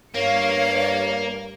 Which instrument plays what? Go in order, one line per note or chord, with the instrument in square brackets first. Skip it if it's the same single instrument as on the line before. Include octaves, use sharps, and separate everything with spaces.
[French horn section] G2 [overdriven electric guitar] A#3 [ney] C#5 [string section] F5 C#7